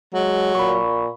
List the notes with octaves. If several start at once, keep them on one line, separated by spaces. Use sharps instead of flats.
F#3 G#3
A#2 B5 C#6